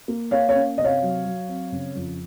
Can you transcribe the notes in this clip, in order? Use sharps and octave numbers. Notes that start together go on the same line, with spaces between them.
A#3
A#3 C#5 F5
C#5 F5
C#4
C3 D#5
C#5 F5
F#3
F#3
C4
C#3
F2